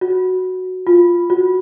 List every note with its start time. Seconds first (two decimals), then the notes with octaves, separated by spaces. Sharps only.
0.01 F#4
0.87 F4
1.30 F#4